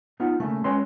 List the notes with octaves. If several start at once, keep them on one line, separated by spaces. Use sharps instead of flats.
B3 D#4 F4 F#5
C#3 A3 A#3
G#3 C#4 B4 C#5 G5 C6